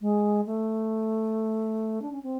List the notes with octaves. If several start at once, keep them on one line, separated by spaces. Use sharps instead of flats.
G#3
A3
D4
C#4
C4